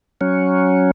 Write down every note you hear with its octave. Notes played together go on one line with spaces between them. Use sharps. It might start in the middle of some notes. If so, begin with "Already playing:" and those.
F#3 C#4